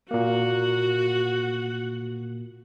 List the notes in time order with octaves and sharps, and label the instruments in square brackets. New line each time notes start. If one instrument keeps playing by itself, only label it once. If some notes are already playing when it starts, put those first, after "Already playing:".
[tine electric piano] A#2 A#3 [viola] F#4 F#5